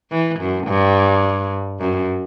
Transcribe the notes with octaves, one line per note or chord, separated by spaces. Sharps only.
E3
F#2
G2
F#2